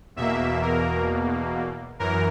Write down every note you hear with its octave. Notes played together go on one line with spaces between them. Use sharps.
E2 B2 A#3 E5
A#4
F#2 E3 A#4